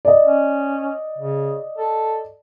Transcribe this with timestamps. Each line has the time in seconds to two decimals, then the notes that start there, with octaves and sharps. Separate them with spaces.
0.05 D5 D#5
0.25 C#4
1.18 C#3
1.78 A4